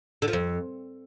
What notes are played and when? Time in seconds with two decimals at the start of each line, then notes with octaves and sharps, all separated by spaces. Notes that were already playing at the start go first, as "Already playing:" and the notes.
0.22 D3
0.28 F3
0.33 F2